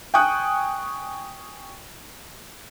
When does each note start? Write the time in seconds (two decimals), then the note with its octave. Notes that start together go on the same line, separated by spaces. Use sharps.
0.14 G5 G#5 C#6 D#6 F#6